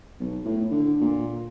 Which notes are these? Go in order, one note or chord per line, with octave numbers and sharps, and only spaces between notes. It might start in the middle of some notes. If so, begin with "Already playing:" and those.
B1
A2
D3
A#2